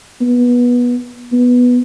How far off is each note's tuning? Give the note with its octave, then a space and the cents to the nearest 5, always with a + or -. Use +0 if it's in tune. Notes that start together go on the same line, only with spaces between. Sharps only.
B3 -20
B3 -5